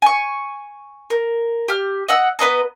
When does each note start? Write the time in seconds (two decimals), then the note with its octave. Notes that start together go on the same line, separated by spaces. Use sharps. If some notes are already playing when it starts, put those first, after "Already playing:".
0.02 G#5 C#6
1.10 A#4
1.68 G4 F6
2.08 D#5 F#5 E6
2.39 B3 B4 D#5 A#5